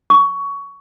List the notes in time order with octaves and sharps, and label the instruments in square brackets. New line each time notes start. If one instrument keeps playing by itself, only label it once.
[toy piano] C#6